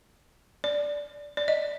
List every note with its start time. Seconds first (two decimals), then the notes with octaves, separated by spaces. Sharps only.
0.64 D5
1.37 D5
1.48 D#5